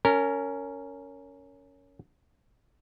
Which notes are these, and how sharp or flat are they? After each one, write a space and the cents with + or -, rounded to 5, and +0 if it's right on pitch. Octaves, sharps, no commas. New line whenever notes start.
C#4 +10 A#4 -20